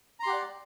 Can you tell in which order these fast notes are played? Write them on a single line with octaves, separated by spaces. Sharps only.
A#5 C6 G4 F#5 D5